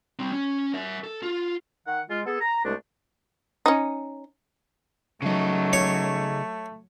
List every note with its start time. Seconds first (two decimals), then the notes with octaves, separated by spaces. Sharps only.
0.19 G3 C4
0.32 C#4
0.74 A#4 E5
1.04 A4
1.23 F4
1.87 D#3 F#5
2.10 G#3 F4
2.26 B3 G#4 A4
2.41 A#5
2.65 C2 G#3 A3 D4
3.66 C#4 D#4
5.22 C#3 F#3 A3 D#4
5.73 C#5